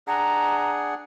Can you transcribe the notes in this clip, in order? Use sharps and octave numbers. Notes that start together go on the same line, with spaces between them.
D4 G#4 F#5 A#5